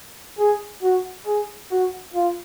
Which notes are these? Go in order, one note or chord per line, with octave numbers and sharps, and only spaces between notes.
G#4
F#4
G#4
F#4
F4